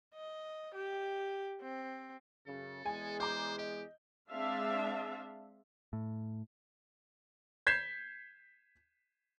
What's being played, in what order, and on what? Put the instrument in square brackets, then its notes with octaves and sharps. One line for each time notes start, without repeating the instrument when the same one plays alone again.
[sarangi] D#5
G4
C4
[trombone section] F#2 C#3 [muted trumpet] A4
[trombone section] E2 G#3 G#4 [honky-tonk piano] G#5
[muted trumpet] C5 [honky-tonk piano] A#5 D6 G6
[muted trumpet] G4 [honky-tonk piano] D#5
[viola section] G#3 C4 D4 E5 F5 A5
[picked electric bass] A2
[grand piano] G6 G#6 B6 C7 E7